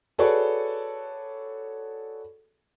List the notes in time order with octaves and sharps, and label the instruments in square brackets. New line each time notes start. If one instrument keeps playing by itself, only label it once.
[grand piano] F#4 G#4 A4 B4 C#5 D5